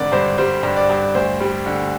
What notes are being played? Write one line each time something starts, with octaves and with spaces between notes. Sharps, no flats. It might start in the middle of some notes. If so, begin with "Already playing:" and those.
Already playing: G#1 D3 D5
G2 C5
G3 C5
G2
D5
G2
D2 C5
G3
D3